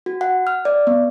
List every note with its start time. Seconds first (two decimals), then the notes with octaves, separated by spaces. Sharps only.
0.06 F#4
0.21 F#5
0.47 F6
0.65 D5
0.87 B3